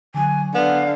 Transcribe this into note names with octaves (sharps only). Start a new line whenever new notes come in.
D3 F#3 G#5
D3 B3 D5 F5